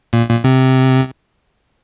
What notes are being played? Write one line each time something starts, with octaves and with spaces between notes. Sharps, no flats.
A#2
A#2
C3